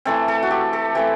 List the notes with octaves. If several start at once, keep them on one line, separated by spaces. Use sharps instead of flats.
E3 A3 C4 A4
A4
F#4
G4
A4
E3 A3 C4 G4